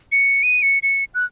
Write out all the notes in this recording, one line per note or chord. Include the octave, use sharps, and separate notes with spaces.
C#7
D#7
C#7
C#7
F#6